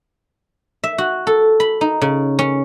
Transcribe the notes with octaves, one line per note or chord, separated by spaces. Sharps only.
E5
F#4
A4
B5
D#4
C#3
C#4